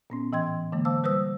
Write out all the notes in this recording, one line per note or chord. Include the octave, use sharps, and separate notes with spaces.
A#2 B3 C#4
A2 E3 D#5 G5 C6 G#6
D3 E3 G#3 A#3
C5 F5 A5 D6 E6
G3 B4 C5 D#6 E6